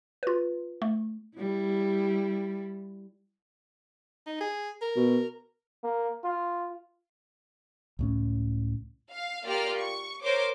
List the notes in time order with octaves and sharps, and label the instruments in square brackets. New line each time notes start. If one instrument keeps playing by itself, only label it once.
[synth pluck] F4 B4
A3
[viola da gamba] G3 E4
[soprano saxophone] D#4
G#4
A#4
[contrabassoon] B2
[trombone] A#3
F4
[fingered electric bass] C#2 A2 C#4
[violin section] F5
A#3 F4 G4 D5 F6
C#6
A#4 C5 C#5 D6